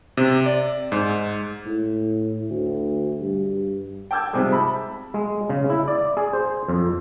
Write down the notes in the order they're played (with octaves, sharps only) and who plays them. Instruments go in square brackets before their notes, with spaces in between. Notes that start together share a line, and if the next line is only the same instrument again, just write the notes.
[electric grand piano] C3
D5
G#2
[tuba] A2
D2
G2
[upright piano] G5 A5 D6 E6 G6 G#6
G#2 C3 F3 G3 G#3
A5 B5
[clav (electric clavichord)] G#3
C#3
E4
D5
G#4
C5
F2